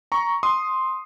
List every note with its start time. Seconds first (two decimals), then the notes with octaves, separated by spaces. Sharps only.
0.12 A#5 C#6
0.43 C6 D#6